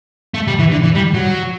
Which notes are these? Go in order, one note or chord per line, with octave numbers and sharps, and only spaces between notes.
A3
G3
E3
D3
E3
G3
F#3